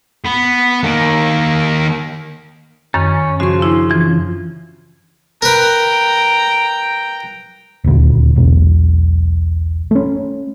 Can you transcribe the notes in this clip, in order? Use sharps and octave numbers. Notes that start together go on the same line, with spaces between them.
B3
D#3 A#3
F#2 D#3 C#4
C#3 F3 F#4 C#6
D4 E4
E3 F4
A#4 B4 G5 A#5
D#1 D2
E1 B1
A3 C#4